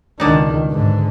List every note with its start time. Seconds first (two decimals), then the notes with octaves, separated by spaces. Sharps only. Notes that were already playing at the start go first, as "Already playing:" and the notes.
0.20 C#2 B2 D#3 D4 D#4
0.70 G#2 D3